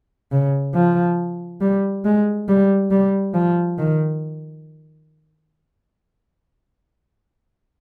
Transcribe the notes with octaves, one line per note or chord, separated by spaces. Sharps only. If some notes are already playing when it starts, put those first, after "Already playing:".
C#3
F3
G3
G#3
G3
G3
F3
D#3